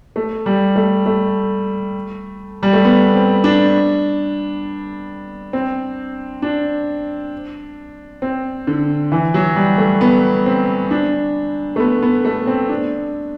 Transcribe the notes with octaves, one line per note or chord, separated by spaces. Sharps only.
A3
G3
A3
A3
G3
A3
B3
C4
D4
C4
D4
C4
D3
E3
F#3
G3
A3
B3
C4
D4
A3
B3
B3
A3
C4
D4